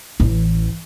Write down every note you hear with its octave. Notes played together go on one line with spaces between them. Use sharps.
A1 E3